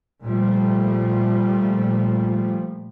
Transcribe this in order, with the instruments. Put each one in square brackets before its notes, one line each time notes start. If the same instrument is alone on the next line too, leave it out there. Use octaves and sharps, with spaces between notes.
[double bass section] A#2 F3 G3 A3